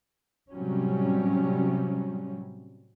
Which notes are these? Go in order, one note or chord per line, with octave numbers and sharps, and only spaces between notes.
A2 C3 F#3 G3 C#4